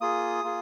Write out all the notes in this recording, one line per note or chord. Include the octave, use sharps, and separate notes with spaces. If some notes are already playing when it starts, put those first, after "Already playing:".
A#3 F4 G#4 D#6
A#3 F4 G#4